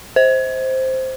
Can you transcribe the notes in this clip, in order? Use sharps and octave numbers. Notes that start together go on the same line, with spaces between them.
C5